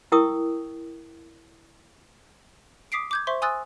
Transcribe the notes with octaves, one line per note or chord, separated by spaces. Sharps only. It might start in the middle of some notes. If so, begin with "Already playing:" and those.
E4 A#4 G5 C#6 D#6 E6
D6 D#6 B6 C7 D7
D6 G6 G#6
C5 E5 C6 C#6
G#5 C6 D#6 E6 F#6 A6